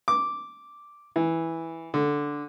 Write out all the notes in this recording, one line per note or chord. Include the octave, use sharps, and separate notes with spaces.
D6
E3
D3